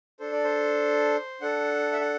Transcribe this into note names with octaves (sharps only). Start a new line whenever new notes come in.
D4 A4 C5
D5
C5
D4 A4 F#5
E5
F#5